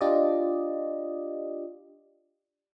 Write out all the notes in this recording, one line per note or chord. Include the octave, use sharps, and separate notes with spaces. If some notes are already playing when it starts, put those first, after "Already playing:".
D4 F4 G4 D5 D#5